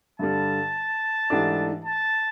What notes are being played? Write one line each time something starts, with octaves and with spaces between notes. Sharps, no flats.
G2 D3 G3 A5
G#2 E3 A3 D4 G4
A5